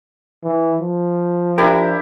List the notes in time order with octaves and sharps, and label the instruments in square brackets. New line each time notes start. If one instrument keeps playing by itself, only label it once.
[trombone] E3
F3
[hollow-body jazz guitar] D4 A#4 [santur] E4 G4